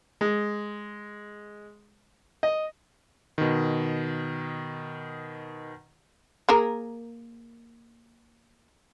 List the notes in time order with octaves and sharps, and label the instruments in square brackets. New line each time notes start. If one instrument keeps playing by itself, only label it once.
[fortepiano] G#3
D#5
[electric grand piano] B2 D#3
[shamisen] A#3 G#4 A#4